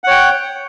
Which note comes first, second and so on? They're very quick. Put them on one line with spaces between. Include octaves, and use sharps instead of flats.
F#5 C#5 G5